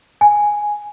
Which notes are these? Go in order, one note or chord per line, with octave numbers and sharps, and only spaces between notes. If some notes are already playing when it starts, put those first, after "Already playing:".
G#5